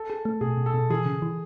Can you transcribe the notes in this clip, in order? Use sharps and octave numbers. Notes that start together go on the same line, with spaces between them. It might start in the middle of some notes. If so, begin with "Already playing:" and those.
Already playing: A4
G#4
A3
B2 G#4
B2
A4
B2
E3 G#4
C#3
E3